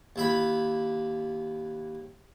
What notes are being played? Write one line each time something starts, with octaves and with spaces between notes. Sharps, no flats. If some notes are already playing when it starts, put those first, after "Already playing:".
D#2 E4 B5